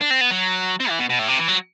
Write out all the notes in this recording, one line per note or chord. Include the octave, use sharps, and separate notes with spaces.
D4
C4
B3
F#3
C4
E3
B2
B2
A2
C3
E3
F#3